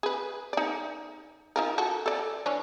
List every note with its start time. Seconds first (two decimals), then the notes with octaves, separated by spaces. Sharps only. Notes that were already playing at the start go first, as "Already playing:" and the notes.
0.03 G#4 B4
0.53 D#4 D5
1.56 D#4 F4 A#4
1.78 F#4 A4
2.06 A4 D5
2.46 E3 C#4 D4